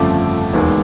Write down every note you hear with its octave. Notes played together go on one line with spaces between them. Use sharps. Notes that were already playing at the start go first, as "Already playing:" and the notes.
Already playing: G1 F2 C#3 F3 A3 D6
E1 D#2 D#3 G#3 B3